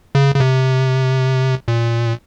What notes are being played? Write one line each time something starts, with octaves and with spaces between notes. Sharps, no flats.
C#3
C#3
C3
A#2